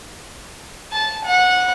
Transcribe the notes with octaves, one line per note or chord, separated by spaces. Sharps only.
A5
F#5